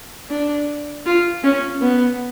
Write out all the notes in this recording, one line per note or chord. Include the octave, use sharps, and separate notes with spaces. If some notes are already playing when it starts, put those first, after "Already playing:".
D4
F4
C#4
B3